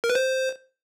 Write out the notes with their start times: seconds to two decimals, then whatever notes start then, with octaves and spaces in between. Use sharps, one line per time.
0.04 A#4
0.10 B4
0.15 C5